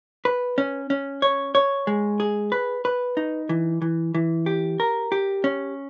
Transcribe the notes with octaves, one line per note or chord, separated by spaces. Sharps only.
B4
C#4
C#4
C#5
C#5
G#3
G#4
B4
B4
D#4
E3
E3
E3
G4
A#4
G4
C#4